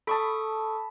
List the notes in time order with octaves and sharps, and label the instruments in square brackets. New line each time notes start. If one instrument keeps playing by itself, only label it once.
[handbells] A4 C#6 D#6 [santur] A5 B5